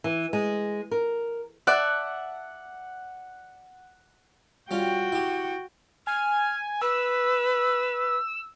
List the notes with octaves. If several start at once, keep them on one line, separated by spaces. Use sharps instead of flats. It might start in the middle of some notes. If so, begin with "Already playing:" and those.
E3
G#3
A#4
D5 E5 F#5 A5
G3 C#4 F4 F#4 G5
E4 G4
G#5 F6
B4 E6